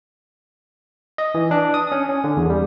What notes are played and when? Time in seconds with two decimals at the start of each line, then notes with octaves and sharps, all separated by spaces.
1.18 D#5
1.35 E3
1.51 D4
1.74 D#6
1.92 C#4
2.09 C#4
2.24 D3
2.37 E2
2.50 G3